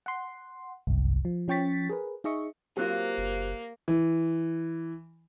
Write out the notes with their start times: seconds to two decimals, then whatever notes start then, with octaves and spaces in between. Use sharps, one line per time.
0.06 F#5 C6
0.87 G1 C2 F#2
1.25 F3
1.48 F3 C#4 G5 C#6 A6 B6
1.89 G#4 A#4 B4
2.24 D#4 G#4 D#5 E5 C#6
2.77 F#3 A#3 C4 F4 G4 C5 F#6
3.18 F#1
3.88 E3